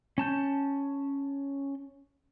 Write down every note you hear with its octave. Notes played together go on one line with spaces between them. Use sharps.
C#4 A5 G6